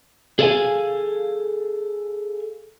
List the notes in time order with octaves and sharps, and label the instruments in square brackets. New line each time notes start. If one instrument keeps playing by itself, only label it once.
[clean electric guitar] G#4 A4 D5 E5 F5 G#5